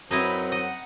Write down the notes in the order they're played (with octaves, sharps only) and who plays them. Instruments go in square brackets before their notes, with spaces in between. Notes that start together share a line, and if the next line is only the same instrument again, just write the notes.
[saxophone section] F#2 F#3 [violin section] C4 B4 [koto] D#4 E4 D#5
[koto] D#5 [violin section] F#5